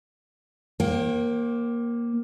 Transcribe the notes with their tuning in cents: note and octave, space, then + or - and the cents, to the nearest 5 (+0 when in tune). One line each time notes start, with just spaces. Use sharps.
A#3 +15 C5 +45 G5 -25